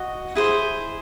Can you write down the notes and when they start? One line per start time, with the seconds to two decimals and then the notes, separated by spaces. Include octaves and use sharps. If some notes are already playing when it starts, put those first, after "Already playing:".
Already playing: F#4 D#5
0.35 E4 G#4 C5